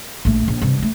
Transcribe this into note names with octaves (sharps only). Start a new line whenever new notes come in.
A#1 A3
A#1
G2 C3
F3 A3